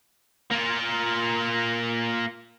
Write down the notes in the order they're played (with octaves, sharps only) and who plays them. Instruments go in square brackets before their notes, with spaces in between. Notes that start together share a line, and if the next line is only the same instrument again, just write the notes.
[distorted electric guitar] A#3 F4